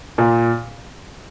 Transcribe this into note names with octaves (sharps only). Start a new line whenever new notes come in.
A#2